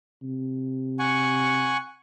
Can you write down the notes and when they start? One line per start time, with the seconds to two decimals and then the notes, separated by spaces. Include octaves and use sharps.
0.22 C3
0.99 F#5 G#5 C#6